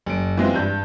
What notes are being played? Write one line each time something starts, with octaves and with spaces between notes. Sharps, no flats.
F#1 D7
E3 G#3 C4 F4
G2 G6